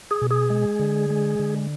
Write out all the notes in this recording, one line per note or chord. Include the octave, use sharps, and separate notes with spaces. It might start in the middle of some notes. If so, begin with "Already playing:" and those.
G#4
B2
G#4
G#3
D3
G#3
D3